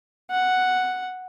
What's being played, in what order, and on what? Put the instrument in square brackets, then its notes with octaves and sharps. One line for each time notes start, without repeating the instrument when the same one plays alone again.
[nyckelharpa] F#5